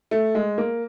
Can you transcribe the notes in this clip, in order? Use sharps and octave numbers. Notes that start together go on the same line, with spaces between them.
A3
G#3
A#3